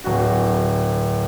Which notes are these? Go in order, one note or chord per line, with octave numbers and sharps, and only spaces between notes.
D1 F#4